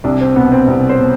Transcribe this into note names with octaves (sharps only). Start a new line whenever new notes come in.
C2 D4
C4
B2 B3
C4
C2
C5
B2